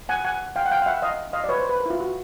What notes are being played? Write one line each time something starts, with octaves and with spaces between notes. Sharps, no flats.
F#5 G#5
F#5 G#5
F5 G5
F#5
F5 G5
F5
E5 F#5
D#5 F5
D#5 F5
D5
B4 C#5
C5
B4
A#4
E4
F4
F#4